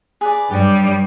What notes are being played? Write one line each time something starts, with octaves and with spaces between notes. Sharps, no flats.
G#4 B4 D5
G2 G3 G4 C#5 D#6